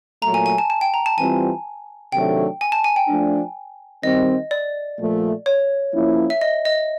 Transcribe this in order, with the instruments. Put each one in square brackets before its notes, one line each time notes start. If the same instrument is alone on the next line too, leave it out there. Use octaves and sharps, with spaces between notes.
[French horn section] A#2 F#3 A3 [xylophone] A#5
[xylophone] G#5
G#5
A5
A5
G5
A#5
A5
[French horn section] E3 G3 C4 F4 [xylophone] G#5
[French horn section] C3 D#3 F#3 A3 D4 [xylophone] G5
[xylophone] G#5
A5
G#5
G5
[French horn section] F3 A3 D4
[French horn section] D#3 G3 C4 [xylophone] D#5
[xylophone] D5
[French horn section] A#2 F3 A3
[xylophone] C#5
[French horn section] F3 A#3 C#4 E4
[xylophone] E5
D#5
D#5